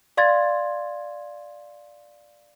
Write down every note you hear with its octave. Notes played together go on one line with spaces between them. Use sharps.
D5 F5 C6 G#6 A6